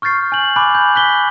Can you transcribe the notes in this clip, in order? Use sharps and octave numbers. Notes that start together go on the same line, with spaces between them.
C#6 F6 G6 A6 C7
G#5 G6 F#7
G#5 B5 D6 F#6
G6
F#6 B6 G7